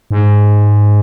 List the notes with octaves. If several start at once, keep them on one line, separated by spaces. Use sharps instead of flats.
G#2